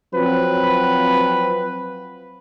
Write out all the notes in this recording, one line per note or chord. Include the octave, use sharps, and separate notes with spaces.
F3 F#3 C4 B4